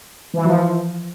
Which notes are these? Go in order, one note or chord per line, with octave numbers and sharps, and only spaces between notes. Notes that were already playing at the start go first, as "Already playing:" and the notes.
E3
F3